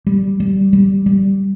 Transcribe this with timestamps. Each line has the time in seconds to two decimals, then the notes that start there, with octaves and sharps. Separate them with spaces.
0.07 G3
0.40 G3
0.73 G3
1.06 G3